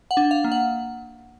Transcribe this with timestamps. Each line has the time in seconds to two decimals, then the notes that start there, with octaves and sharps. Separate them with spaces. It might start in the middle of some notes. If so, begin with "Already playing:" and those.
0.11 F#5
0.17 D4
0.31 F5
0.44 A#3
0.52 F#5